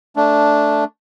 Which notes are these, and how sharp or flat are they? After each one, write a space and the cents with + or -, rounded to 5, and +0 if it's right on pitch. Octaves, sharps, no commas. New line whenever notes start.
A3 +0 D4 -5